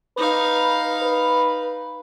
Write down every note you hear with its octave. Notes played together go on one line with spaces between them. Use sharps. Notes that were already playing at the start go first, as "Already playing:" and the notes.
D#4 B4 F5
B4